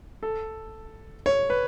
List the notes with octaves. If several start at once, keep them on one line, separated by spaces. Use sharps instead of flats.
A4
C#5
B4